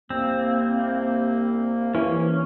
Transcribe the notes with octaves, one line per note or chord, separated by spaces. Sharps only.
C2 A#3 C4
E3 C#4